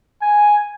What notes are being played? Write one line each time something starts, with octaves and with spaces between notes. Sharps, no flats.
G#5